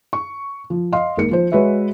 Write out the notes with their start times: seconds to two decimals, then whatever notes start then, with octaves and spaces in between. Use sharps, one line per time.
0.13 C#6
0.70 F3
0.92 D#5 F5 C6
1.17 G#1 A#3 C#7
1.31 F3 C5
1.52 G#3 F#4 B4 C#5 E5